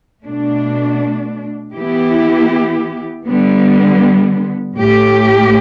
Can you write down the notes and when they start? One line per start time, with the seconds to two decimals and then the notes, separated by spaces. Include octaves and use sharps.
0.25 B2 A3 D4
1.75 E3 B3 E4 G4
3.26 D3 G3 B3
4.75 A2 A3 G4